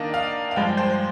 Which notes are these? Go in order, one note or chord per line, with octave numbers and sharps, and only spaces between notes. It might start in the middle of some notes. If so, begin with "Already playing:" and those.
Already playing: D#3 A#3 D4 D#5
F5
F5
G2 F3 G#3 G5
C5